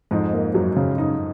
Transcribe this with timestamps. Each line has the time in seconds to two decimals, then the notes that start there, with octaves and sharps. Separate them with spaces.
0.11 F2 G#2 D#4
0.33 A#3
0.55 F#2 F#3
0.76 C#3
0.98 D#4